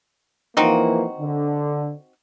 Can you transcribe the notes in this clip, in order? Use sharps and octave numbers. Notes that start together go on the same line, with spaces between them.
E3 F3 A#3 C4 D#4 F#4
D3